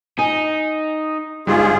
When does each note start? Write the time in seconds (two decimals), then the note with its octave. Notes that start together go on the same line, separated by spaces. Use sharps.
0.19 D#4 G#5
1.47 G1 G#2 G3 F4 G#4